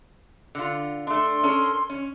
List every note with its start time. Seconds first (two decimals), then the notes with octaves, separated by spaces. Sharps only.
0.55 D3 F4
1.07 A3 D4 C6
1.44 C#4 A4 A#4
1.90 C#4